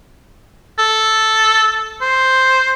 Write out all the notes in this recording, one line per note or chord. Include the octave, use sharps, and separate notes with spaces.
A4
C5